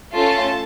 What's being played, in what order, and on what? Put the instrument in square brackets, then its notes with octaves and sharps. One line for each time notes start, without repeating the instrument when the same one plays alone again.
[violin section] A3 C#4 F4 A4 A5